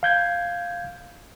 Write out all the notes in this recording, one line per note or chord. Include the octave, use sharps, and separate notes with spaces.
F5 G6 G#6